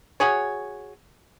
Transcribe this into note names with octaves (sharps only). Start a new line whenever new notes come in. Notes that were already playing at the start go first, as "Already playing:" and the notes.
F#4 G#4 C#5